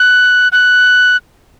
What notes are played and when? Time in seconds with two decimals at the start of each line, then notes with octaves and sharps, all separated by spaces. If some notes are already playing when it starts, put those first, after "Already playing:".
Already playing: F#6
0.52 F#6